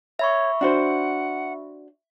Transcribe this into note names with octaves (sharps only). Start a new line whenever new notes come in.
C#5 E5 B5 C#6
D4 F#4 C5 F#5